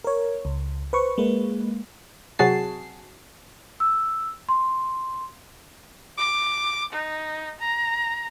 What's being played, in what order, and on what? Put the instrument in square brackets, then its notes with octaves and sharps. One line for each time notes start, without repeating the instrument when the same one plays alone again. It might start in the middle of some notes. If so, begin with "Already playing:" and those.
[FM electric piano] A#4 C#5
C#2
B4 C5 C#6
G#3 A#3 B4
[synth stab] C3 F#3 F#4 G#4 A5 C7
[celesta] E6
C6
[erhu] D6
D#4
A#5